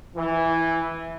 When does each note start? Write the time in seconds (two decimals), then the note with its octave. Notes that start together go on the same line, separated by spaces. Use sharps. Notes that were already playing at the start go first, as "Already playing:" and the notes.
0.16 E3